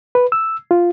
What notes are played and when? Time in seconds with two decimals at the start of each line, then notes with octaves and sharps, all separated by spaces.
0.15 B4
0.32 E6
0.71 F4